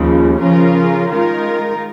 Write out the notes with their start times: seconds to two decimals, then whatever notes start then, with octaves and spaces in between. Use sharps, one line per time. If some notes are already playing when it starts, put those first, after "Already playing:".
Already playing: D#2 C#3 F3 G#3
0.39 C#3 F3 C#4 F4 A#4
1.09 D#3 G#3 F4 A#4